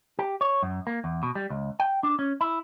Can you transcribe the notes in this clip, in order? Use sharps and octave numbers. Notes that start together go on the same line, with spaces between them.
G4
C#5
F#2
A#3
E2
B2
G3
C#2
G5
D4
C#4
E4